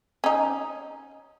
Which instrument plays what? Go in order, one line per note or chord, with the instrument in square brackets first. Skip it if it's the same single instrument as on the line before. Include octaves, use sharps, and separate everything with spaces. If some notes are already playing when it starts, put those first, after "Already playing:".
[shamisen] C#4 D#4